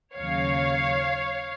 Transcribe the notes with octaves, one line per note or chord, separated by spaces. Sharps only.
D#2 C#3 F#3 C#5 F5